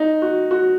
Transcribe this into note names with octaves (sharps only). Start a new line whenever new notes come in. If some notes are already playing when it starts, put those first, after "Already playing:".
Already playing: D#4
F#4
F#4